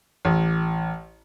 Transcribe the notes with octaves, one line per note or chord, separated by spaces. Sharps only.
A1